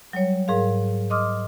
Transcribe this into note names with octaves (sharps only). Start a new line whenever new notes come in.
F#3 G3 C#5
G#2 G#4 A#4 F5
D#5 C6 D6 D#6 F6